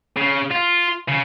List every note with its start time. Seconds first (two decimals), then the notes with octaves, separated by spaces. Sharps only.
0.16 C#3
0.51 F4
1.09 C#3